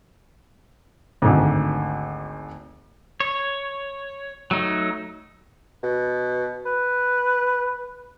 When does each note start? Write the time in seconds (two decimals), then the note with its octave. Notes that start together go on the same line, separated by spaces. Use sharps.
1.22 G#1 D2
3.20 C#5
4.51 F#3 A3 D#4
5.83 B2
6.65 B4